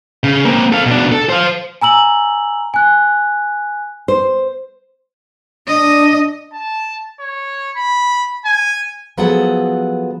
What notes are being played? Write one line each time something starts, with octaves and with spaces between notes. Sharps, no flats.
C#3
A#3 C4
A4 F5
B2 D4
A4
C5 F5
G#5 A#5 E6 F#7
G#5 F#6
C5
D4 D#5
A5
C#5
B5
G#5
F3 F#3 B3 G#4 A4 F#5